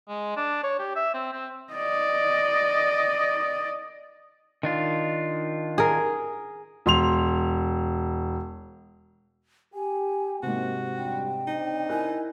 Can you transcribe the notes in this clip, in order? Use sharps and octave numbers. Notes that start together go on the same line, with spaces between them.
G#3
D4
C#5
G4
E5
C4
C4
D5 D#5
D#3 D4 F4
G#4 A#4
E1 C6 F7
G4 G#5
G#2 C3 A#3 F#4
F2 G3 D4 G5
C#3 C4 D4 D#4
E4 A#4 G#5 F#6